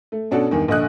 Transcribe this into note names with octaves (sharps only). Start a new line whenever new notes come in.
A3
B2 C#4 D4 F#4 A4
E2 G2 D#3
A#1 D3 D#5 F#6